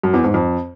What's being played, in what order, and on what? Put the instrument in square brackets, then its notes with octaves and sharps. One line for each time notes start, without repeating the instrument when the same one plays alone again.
[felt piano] F#2
E2
G#2
F2